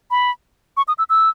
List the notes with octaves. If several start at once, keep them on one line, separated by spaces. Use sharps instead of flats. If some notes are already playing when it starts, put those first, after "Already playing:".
B5
C#6
D#6
E6
E6